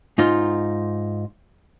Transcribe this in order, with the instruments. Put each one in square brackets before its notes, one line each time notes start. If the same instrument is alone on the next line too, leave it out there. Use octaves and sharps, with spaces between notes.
[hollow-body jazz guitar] G#2 D#4 F4